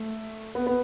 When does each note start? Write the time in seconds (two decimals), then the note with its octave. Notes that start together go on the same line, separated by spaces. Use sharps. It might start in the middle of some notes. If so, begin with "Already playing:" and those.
Already playing: A3
0.55 B3
0.67 B3